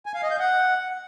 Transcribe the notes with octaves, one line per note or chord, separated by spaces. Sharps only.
G#5
F5
D#5
G6
F#5